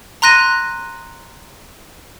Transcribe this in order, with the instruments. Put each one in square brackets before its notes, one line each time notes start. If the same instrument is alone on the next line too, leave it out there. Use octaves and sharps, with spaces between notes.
[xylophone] A#5 C6 F#6 A#6 D#7